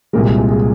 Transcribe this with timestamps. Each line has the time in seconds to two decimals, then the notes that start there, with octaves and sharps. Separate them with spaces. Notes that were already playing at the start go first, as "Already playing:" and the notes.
0.13 C2 A#2 G#3 A#4
0.26 G#4
0.38 G#4
0.51 G#4